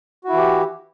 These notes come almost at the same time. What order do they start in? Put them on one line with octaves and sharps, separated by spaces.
F#4 E4 E3 G4